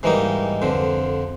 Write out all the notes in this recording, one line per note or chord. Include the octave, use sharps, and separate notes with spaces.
G#2 E3 G3 A#3 D#4
F2 D3 F3